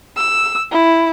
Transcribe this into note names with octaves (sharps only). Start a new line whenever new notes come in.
E6
E4